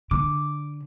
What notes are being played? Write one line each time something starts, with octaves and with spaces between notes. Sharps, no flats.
D3 D6